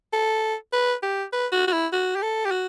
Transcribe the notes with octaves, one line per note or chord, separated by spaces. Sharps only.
A4
B4
G4
B4
F#4
F#4
E4
F#4
G4
A4
G4
F#4